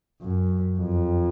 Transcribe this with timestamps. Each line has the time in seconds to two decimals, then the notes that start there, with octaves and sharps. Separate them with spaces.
0.22 F#2
0.78 F2